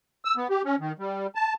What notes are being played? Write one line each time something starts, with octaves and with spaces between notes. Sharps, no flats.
E6
B3
G4
C#4
D#3
G3
A5